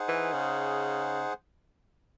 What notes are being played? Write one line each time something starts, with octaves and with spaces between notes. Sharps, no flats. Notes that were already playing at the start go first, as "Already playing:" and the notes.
Already playing: D#4 G#4 C5 F#5
E3
C#3